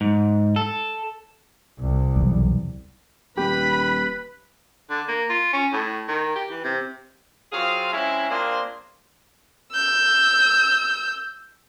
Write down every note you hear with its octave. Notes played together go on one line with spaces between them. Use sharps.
G#2
A4
C2
B1 E2 G3
D#1 G4 B4 B5
D3
A#3
F4
C#4
A2
D#3
G4
E3
C3
F#3 C4 F4 G#4 F5
G#3 C4 C#4 E4
A#3 C4 D4 F4 G#4 C5
E6 G6